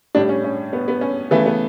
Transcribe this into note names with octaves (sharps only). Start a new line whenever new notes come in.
A2 G3 D4
C#4
C#4
B3
B3
C#4
C#3 E3 A3 B3
B3